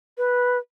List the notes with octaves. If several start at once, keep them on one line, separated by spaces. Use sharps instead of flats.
B4